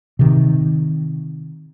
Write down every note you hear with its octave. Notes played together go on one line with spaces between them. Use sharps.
C3 D#3